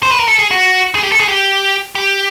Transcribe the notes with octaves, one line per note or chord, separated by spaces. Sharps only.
C5
B4
A#4
A4
G#4
F#4
G#4
G4
A4
G#4
G4
G4